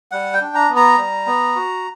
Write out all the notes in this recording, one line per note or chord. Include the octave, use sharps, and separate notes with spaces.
G3 F#5
G5
D4
A#5
B3
A#5
G3
B3
F#4